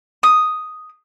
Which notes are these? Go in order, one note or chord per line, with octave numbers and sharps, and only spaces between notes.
D#6